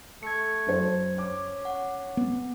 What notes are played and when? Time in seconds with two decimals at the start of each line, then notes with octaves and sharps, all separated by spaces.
0.23 A3 G#6 C#7
0.66 F#2 C5
1.18 C#4 D6
1.65 F#5
2.17 B3